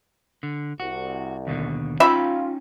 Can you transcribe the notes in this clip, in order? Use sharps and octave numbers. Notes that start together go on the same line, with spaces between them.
D3
C2 F#4
D#2 B2 D3
C#4 D#4 F4 E5 G5 B5